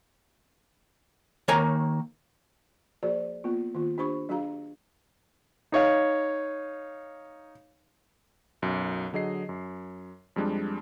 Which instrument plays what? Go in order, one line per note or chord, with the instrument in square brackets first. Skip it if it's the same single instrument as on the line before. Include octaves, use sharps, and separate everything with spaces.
[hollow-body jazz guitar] D#3 A#3 C#5 G#5 A#5
[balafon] F3 A#3 F#4 G#4 C5 D5
A#3 B3 F4
D#3 A#3 F4
D4 G4 C5 B5 C#6
F#3 D4 F#4 G#4 F5 A#5
[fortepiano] D#4 C#5 F5
[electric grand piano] B1 F#2
D3 F#3 G#4 D#5 C7
F#2
F2 G3 G#3 D4